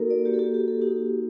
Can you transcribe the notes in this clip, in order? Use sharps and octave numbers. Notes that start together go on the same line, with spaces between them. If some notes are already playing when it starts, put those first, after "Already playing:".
Already playing: A#3 D#4 F#4 A4 A#4
D5
A#3 F#4 G4
A4
G4
G4
A4
A#3 D#4 F#4 G4